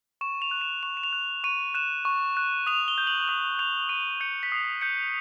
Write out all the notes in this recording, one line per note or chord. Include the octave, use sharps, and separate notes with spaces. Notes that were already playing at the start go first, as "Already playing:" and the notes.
C#6 E7
F7
F#6
E7
C#6 F7
E7
F7
F#6
C#6 D#7
F#6 E7
C#6
F#6
D#6 F7
G7
G6
F#7
D#6 F7
G6 F7
D#6 D#7
G6 C#7
B6
D#6 C7
G6 C#7